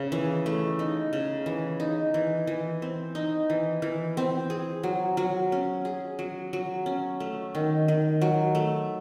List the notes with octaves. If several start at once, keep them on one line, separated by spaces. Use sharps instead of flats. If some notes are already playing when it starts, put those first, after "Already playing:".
Already playing: C#3
E3
A3
D#4
C#3
E3
D#4
E3
E3
C4
D#4
E3
E3
C4
G#4
F#3
F#3
C#4
G#4
F#3
F#3
C#4
A3
D#3
D#3
F#3
A3